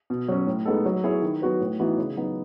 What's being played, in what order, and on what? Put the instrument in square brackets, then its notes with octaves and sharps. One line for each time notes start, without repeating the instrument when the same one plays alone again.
[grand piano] B2
F#3 C#4
A2
G#3 B3 D#4 A4
F#3
B3 E4 G#4 C#5
D#3
F#3 B3 F#4 B4
A2
E3 B3 D#4 F#4
C#3
F#3 B3 D#4